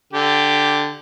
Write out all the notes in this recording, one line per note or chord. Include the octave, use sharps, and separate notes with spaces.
D3 G4